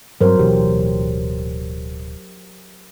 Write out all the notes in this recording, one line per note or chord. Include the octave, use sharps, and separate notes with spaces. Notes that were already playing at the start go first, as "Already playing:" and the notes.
G2 F#3 C4 A#4 C5
D1 B2 E3 G4